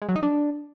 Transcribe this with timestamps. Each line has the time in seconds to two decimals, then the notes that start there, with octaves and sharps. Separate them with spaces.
0.02 G#3
0.09 F#3
0.16 D#4
0.23 D4